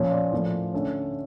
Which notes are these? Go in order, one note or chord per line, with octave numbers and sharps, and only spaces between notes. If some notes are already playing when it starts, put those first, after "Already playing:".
Already playing: A#2 F3 A#3 C#4 C#5
D5
A2 F3 A#3
D3 A3 C#4